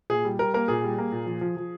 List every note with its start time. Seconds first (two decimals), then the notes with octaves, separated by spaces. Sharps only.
0.10 A#2 G#4
0.25 G3
0.39 G3 A#4
0.54 A#3 A#4
0.68 A#2 G#4
0.84 G3
0.98 A#3
1.12 A#2
1.26 F3
1.41 F3
1.56 F3